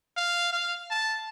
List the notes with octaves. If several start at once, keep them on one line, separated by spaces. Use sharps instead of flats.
F5
F5
A5